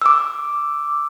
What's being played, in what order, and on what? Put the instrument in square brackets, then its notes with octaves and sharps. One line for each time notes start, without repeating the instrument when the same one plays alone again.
[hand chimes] D6 E6